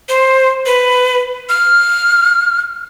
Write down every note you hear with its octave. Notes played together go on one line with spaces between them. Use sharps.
C5
B4
F6